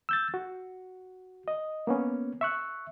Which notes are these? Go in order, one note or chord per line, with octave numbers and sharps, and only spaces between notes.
E6 G6 A6
F#4
D#5
A#3 B3 C#4
E5 C#6 F#6